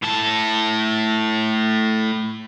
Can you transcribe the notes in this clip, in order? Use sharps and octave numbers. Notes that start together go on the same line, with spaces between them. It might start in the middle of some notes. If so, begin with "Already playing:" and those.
A2 A5